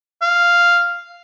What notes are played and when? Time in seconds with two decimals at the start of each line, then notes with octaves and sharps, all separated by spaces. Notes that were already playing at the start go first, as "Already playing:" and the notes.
0.22 F5